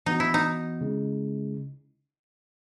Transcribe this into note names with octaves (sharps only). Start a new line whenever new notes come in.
E3 B3 D#4 F#4
E4
D#4
C#3 G#3 C#4 E4